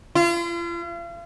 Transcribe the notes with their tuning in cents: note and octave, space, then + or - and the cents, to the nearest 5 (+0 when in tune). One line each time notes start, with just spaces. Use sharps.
F4 -40